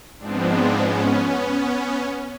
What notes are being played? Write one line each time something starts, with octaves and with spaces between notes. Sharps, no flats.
G#2 F3 G#3 B3 C4 D4
C4 D4
B3 C#4